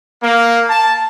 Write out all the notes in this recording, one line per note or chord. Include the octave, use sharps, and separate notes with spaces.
A#3
A5